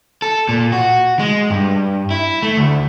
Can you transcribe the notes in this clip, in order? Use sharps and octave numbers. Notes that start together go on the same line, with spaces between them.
A4
A#2
F#4
G#3
G2
E4
A3
D2